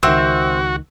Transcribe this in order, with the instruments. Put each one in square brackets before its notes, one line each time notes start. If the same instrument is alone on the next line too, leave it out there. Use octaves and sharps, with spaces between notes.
[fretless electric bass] C#2 D#3 [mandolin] C4 [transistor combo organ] F#4 [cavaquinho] C5 E5 F#5